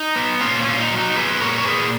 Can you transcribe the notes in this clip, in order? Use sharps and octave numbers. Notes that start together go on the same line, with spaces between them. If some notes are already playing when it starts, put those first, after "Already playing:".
Already playing: D#4
B3
A#2 C#4 F4
C#4
A#2 F4
D#4
F#3
D#4
B3 G#4 B4
A#2 A#4 C#5
C#5
A#2 G#4 B4